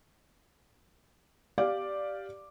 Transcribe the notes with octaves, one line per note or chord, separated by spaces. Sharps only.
G4 D5 F5 D6